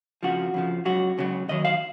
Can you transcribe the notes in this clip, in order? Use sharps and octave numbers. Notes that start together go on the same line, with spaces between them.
F2 C#3 F3 F#4
F2 C#3 F3
C#2 C#3 F#3 F#4
C#2 C#3 F#3
D#2 D#3 F#3 D#5
F5